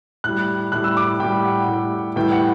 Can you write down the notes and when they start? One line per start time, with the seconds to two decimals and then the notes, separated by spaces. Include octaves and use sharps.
0.24 A2 G3 F#6
0.72 A2 G3 F#6
0.84 E6
0.97 D6
1.20 A2 G3 G5
1.45 F#5
1.68 A2 G3
2.16 A2 E3 G3 G5
2.32 F#5